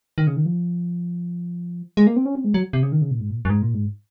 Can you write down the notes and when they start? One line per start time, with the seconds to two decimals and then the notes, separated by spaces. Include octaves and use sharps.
0.18 D#3
0.27 C#3
0.36 D#3
0.46 F3
1.97 G#3
2.07 A#3
2.16 C4
2.25 C#4
2.35 C4
2.44 G#3
2.54 F#3
2.73 C3
2.83 C#3
2.92 D#3
3.02 C#3
3.11 A#2
3.20 G#2
3.30 A#2
3.45 F#2
3.50 G#2
3.62 A#2
3.74 G#2